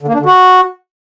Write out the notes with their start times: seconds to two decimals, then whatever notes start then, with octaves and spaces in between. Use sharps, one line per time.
0.02 D3
0.08 A#3
0.14 D4
0.20 D3
0.26 F#4